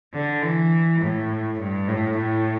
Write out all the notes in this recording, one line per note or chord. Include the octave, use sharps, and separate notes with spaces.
D3
E3
A2
G2
A2
A2